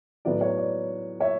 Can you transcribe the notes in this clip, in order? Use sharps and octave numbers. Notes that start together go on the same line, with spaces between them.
A2 F#3 B3 D5
C#5
D5
C#5 E5